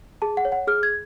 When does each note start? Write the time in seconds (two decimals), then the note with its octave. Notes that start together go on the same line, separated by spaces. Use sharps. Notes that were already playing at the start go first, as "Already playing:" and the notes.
0.22 G#4 A5
0.37 F#5
0.45 C#5
0.52 F#5
0.67 G#4 F6
0.83 G#6